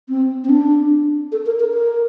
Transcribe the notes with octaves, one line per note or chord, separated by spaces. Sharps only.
C4
C4
D4
A4
A#4
A#4
A#4